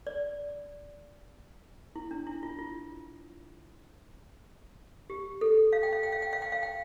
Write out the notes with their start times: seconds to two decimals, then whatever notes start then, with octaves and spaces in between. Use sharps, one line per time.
0.07 D5
1.96 E4
2.11 D4
2.27 E4
2.43 F4
2.58 F4
5.10 G4
5.41 A4
5.73 F5
5.83 G5
5.93 F5
6.03 G5
6.12 F5
6.22 G5
6.33 F5
6.42 G5
6.52 F5
6.63 G5